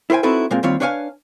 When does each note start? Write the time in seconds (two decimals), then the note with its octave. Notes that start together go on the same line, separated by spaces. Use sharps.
0.10 E4 A#4 C5 G5 G#5
0.23 C4 D#4 E4 F#4 A4 B4
0.51 A#2 G#3 A#3 C4 F4
0.63 D#2 G3 C4 F4 C#5 F5
0.80 D4 B4 C#5 D5 F5 G#5